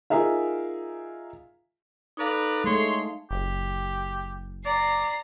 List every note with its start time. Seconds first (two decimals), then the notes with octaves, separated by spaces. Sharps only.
0.10 D#4 F4 G#4 A#4 E5 F5
2.17 D#4 A4 B4 D5 F5 A#5
2.64 G#3 A3 C#5 C6
3.31 F#1 G4
4.66 D5 A#5 C7